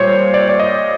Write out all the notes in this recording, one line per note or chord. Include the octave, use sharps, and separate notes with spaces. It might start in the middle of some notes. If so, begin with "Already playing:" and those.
Already playing: A#2 G3 C5 C#5
D5
D5
D#5